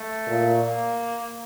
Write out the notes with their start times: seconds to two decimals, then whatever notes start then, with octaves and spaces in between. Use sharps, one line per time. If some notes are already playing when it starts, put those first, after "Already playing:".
Already playing: A3
0.27 A#2
0.63 A#3